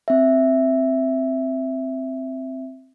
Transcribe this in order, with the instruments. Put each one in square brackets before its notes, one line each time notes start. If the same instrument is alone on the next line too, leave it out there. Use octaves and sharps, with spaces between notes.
[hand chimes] C4 E5